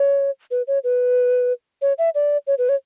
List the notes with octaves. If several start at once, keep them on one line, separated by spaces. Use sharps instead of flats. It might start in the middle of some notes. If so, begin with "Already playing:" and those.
Already playing: C#5
B4
C#5
B4
C#5
E5
D5
C#5
B4
C#5